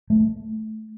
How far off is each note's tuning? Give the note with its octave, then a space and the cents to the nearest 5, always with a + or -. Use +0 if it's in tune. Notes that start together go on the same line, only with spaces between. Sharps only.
A3 -10